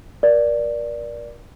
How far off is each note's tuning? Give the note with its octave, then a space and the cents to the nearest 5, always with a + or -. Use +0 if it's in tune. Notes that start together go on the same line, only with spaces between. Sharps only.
A#4 +30 D5 +0